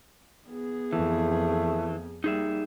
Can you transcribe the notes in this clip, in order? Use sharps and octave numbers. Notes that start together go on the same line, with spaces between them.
B3 G#4
F2 E3 A3
G3 A#3 D#4 G#4 E5